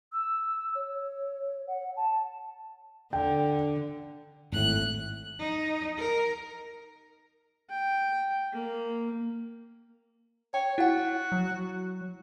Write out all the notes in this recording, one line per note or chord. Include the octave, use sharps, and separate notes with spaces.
E6
C#5
F#5
A5
D3 G5
G#1 A2 F#6
D#4
A#4
G5
A#3
C#5 G5
E4 F#4 F#5
F#3